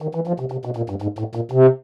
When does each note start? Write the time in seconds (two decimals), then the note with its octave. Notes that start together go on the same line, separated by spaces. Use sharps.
0.02 D#3
0.15 E3
0.27 F3
0.40 C3
0.52 C3
0.65 B2
0.77 A#2
0.90 G2
1.02 G#2
1.19 A2
1.35 A#2
1.52 C3